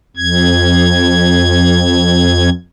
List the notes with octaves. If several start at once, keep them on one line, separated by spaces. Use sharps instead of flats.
F2 G#6